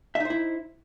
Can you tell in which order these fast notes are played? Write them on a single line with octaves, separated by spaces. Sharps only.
E5 D#4 C5 E4